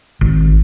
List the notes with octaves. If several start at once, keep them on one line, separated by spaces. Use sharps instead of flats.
G#1